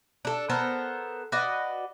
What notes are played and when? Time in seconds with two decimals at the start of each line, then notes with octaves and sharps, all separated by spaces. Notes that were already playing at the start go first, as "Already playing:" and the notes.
0.25 D4 A4
0.50 B3 A4 A#4 C5
1.32 F#4 B4 D5 D#5